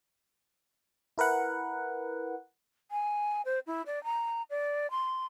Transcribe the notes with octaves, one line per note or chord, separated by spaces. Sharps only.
E4 A#4 B4 F#5
G#5
C5
E4
D5
A#5
D5
C6